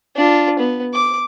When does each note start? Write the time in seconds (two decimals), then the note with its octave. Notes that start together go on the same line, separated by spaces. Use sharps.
0.16 D4 F4
0.59 B3
0.94 D6